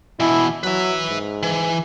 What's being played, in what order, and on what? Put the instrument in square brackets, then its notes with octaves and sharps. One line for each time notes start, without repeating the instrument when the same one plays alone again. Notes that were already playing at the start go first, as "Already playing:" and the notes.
[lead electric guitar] B2 E3 [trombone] E4
[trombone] F#3 [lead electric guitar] B4 E5
[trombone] G#2
[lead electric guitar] E3